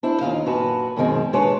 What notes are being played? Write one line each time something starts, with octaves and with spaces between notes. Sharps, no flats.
D4 E4 C5
D#2 B2 D#4 F4 F5
F#2 A#2 F#4 B4 A5
F#2 B2 D#3 G#3 C4
A#2 G#3 D4 B4 C#5 A5